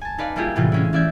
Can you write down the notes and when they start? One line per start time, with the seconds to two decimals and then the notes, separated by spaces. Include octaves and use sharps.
0.01 G#5 A5
0.18 D#4 B4 D5 F5
0.36 G3 A#3 E4 F4 G4 G#4
0.56 A2 C3 E3 F#3 G3 F4
0.72 G#3 C#4 E4
0.93 E3 C#4 D5 E5 G6 G#6